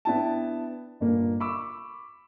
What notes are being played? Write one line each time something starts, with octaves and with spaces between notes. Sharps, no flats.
B3 D4 E4 G5 A5
G1 A#2 A#3
B5 C#6 D6 E6